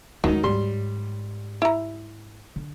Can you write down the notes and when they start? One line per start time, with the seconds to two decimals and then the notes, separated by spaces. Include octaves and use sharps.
0.24 D2 D#3 F#3 G#3 D#4
0.43 G#2 G3 C6
1.62 E4 A#5
2.56 D3